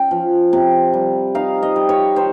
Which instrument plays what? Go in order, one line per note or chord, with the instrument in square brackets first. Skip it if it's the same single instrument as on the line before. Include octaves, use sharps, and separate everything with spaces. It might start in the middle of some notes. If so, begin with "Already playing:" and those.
Already playing: [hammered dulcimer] C#4 G5
F3
C3
G3
D#4 F5
D#5
G3
C#5
D#3 C5